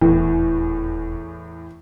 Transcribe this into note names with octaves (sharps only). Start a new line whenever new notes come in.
D#1 E2 A2 E3